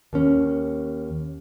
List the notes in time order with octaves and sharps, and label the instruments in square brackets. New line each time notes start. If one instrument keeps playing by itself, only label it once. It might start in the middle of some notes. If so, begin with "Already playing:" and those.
[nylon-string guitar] D#2 C#4